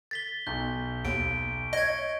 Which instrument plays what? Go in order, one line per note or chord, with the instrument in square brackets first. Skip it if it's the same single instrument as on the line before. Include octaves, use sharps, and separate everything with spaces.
[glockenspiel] A6 B6 G7
[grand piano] B1 [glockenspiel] G6
[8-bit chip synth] D#2 [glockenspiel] D7
[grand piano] C#5 [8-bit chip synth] D#5 G#6